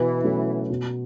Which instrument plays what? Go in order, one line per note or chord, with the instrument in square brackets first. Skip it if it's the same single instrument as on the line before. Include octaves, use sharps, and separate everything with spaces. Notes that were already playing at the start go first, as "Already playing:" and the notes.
Already playing: [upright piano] B2 [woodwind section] E3
[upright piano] F#3 A3 C#4 F#4
B2